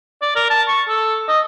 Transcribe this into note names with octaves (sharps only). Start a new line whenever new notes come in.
D5
A#4
A5
C#6
A4
D#5